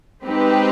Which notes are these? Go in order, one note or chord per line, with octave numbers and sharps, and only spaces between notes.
G#3 C4 D#4 G4 B4